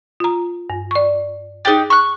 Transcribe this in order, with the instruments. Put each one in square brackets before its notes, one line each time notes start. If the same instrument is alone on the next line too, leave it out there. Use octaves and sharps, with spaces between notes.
[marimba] F4 A#5
G2
D5 C#6
[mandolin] D#4 G4 [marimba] G#4 A6
[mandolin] C#6 F#6